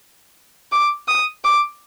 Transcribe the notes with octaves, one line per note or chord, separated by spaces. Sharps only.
D6
D#6
D6